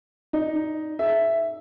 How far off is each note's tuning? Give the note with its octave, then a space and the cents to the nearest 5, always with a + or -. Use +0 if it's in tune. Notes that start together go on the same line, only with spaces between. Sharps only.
D#4 +0 D5 +0
G#4 +35 E5 +5